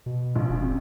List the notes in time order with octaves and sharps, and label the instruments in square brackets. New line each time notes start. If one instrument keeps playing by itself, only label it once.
[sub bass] B2
[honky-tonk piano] A#1
[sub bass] F1
[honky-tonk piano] C3